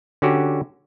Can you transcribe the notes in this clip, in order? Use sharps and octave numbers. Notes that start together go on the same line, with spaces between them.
D3 C#4 F#4 G4